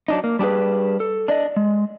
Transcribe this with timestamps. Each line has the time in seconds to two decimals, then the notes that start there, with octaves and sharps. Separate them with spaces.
0.08 F#3 D4 D#4
0.24 A#3
0.39 G3 D4 G4 G#4 B4
1.00 A4
1.28 D4 D5 D#5
1.56 G#3